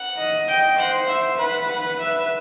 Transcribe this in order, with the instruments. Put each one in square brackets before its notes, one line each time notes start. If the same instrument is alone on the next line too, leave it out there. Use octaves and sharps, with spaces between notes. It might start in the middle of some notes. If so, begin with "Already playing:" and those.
Already playing: [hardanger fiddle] F#5
[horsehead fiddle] D#5
[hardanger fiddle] G5
[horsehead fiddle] C5 [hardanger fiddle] F#5
[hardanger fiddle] E5
[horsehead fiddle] B4 [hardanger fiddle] F#5
[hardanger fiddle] F#5
E5